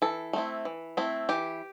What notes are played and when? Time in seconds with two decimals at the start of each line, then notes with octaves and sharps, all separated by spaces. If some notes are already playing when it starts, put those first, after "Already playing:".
0.02 E3 A4
0.33 A3 C4 E4
0.65 E3
0.97 A3 C4 E4
1.29 E3 G4